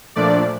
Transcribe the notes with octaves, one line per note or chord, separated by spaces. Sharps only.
A#2 F3 A3 D4 D5